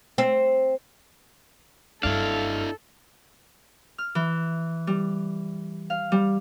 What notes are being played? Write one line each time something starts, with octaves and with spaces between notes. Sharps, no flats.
C4
F#1 G2 D4 E4 A4 F5
F6
E3
G3
F5
G3